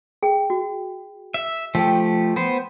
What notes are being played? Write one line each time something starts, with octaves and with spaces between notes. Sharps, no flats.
G#4 G5
F#4
E5
F3 A3 G4 A#4 G5
B3 C5